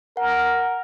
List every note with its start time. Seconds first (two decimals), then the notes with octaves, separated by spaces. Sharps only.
0.17 A#4 F#5